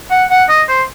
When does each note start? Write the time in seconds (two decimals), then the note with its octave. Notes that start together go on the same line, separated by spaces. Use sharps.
0.11 F#5
0.30 F#5
0.49 D#5
0.69 C5